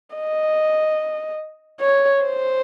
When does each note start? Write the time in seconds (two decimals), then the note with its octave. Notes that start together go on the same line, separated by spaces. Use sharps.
0.15 D#5
1.80 C#5
2.23 C5